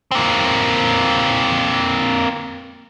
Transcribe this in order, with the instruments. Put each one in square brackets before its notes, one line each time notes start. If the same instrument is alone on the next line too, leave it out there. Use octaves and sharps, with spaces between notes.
[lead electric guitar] A#3 C4